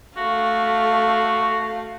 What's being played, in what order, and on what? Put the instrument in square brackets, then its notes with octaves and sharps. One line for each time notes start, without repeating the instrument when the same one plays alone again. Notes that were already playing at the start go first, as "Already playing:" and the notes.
[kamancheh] A3 F5 [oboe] F#4